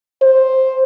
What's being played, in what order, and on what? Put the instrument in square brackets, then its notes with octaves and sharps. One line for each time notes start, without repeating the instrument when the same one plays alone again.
[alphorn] C5